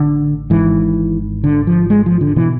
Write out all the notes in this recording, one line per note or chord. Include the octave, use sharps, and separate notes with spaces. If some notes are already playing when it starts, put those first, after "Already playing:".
Already playing: A1 D3
G#1 G#2 E3
D3
F3
G#3
F3
D3
B2 E3